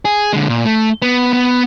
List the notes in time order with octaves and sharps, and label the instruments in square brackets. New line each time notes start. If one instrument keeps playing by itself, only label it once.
[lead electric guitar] G#4
D3 G#3
A#2
A3
B3
B3